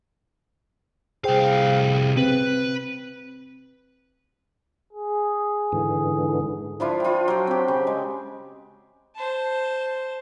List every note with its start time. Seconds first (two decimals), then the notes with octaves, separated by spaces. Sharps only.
1.24 C2 G#4 C5 F5 G5
2.17 C4 B4
4.93 G#4
5.72 G#2 D3 E3
6.80 F3 D4 E4 F4
7.00 F4 G5
7.28 F#3 G5
7.47 C4 G4
7.68 C#3
7.87 G#3
9.15 C5 A5